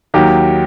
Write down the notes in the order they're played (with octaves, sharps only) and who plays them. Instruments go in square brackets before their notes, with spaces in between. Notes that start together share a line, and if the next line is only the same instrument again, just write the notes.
[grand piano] D#2 D#3 F#3 G4